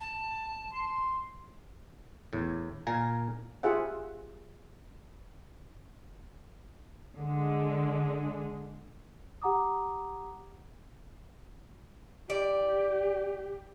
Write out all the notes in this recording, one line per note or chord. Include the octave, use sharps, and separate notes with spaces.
A5
C6
E2 A2
A#2 A#4 F5 G#5
F4 G4 G#4 C5 E5 F#5
D3 G#3
G4 F#5 A#5 D6 D#6
G4 D5